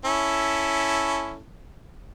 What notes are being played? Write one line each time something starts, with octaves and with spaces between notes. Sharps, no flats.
C#4 E4 A4